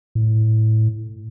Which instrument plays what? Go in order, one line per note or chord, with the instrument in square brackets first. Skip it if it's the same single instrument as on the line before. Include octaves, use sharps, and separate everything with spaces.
[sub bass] A2